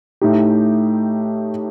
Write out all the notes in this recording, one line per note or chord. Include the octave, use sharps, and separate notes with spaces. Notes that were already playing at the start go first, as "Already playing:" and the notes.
A2 A3 D#4 G4